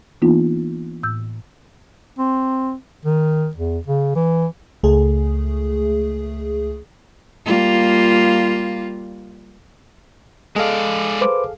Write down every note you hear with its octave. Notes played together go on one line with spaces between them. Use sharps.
E3 A#3 B3 D4 D#4 F4
A2 E6 G6
C4
D#3
E2
C#3
E3
C#2 A3 G#4
G3 A#3 F4
G#3 G#4 A4 D5 D#5 F5
B4 C5 D6